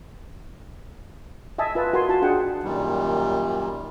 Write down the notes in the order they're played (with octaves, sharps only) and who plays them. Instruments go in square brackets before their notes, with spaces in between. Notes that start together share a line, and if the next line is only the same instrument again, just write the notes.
[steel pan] D#5 E5 G#5 A5
F4 B4 E5 A5
F#4 A#4 G#5 C6
F4 F#4 A5
D4 F4 G#4 F#5 G5
[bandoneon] F#2 A#2 D#3 G3